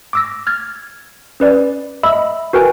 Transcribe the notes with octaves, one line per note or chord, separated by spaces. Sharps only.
D6 E6 A#6
F6 G#6 A6
C#4 B4 D5
D#5 E5 B5 E6
F#4 A#4 B4 G5 G#5